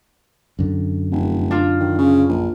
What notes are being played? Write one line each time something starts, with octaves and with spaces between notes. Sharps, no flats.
F#2 D3
F1
D4 F4
D#3
C#3
A#1